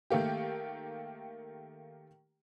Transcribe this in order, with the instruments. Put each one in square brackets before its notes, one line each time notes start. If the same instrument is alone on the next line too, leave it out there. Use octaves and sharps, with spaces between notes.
[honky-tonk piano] D#3 A3 A#3 G4